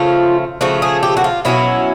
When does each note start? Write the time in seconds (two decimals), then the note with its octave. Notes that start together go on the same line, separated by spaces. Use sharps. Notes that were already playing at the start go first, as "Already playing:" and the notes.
Already playing: C#3 F3 A3 F4
0.61 C#3 F3 A3 F#4
0.82 G#4
1.03 G4
1.17 F#4
1.24 F4
1.45 B2 F#3 A3 C#4 E4